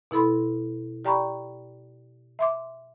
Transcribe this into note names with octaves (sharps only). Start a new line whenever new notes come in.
B2 E4 A4 B5 C6
G4 D5 G5 A#5 B5 C#6
E5 C6 D6